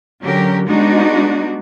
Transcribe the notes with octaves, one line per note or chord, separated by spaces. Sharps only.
D3 F#3 C#4 G4 A#4
G3 G#3 B3 D4 D#4 F#4